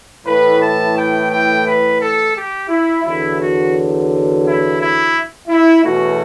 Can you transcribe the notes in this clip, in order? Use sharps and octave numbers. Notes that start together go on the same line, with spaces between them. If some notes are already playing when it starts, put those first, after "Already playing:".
A2 E3 A3 B4
A5
G5
G5
B4
A4
G4
E4
E2 D3 F#3 E4
F#4
E4
E4
E4
E2 B2 A3 C#4 F#4